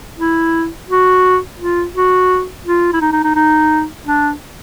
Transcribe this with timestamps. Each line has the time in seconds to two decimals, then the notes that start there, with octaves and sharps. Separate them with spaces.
0.19 E4
0.89 F#4
1.60 F4
1.95 F#4
2.65 F4
2.93 E4
3.01 D#4
3.12 D#4
3.24 D#4
3.35 D#4
4.06 D4